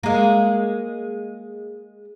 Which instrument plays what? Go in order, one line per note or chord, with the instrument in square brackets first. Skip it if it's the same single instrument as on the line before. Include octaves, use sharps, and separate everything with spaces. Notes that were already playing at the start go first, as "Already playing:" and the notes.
[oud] G#3 A#3